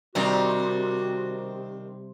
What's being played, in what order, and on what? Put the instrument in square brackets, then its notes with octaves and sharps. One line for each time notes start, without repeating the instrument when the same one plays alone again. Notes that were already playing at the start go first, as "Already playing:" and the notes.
[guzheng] C3 G3 A#5 [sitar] D#3 C4 D4 [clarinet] F#4